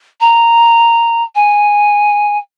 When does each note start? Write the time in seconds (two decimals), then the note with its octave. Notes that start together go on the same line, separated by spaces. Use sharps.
0.21 A#5
1.35 G#5